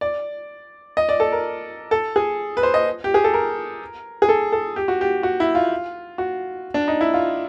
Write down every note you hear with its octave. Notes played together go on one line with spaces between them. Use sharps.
D5
D#5
D5
A4
A#4
A4
G#4
B4
C5
D#5
G4
G#4
A4
A#4
G#4
A4
A4
G4
F#4
G4
F#4
E4
F4
F#4
D4
D#4
E4
F4